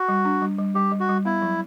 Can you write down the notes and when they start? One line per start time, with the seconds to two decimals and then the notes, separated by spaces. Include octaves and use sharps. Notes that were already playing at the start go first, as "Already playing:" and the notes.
Already playing: F#4
0.08 G3
0.25 D4
0.42 G3
0.58 G3
0.75 G3 G4
0.92 G3
1.00 F#4
1.09 G3
1.25 B3 E4
1.42 F#3